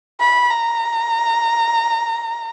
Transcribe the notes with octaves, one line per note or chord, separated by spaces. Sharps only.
B5
A#5